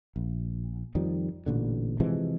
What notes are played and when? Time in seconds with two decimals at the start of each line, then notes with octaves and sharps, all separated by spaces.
0.16 A#1
0.95 F2 D#3 F3 G3
1.46 A1 A#2 D3
2.00 C3 E3 F3 G#3